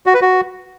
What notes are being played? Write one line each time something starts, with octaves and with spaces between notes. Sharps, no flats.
F#4
B4
F#4